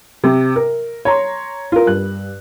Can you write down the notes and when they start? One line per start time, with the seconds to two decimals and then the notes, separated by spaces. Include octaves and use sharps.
0.24 C3
0.56 A#4
1.05 C#5 A#5 C6
1.72 F4 A#4
1.86 G2 F#6